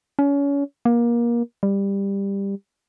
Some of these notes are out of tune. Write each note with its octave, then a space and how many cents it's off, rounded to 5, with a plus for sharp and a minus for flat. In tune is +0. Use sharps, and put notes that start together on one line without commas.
C#4 +30
A#3 +25
G3 +15